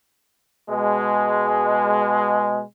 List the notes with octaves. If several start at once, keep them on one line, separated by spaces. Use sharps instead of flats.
B2 G#3